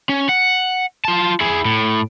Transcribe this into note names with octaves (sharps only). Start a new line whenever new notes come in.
C#4
F#5
F4 A5
E4 G#4
A2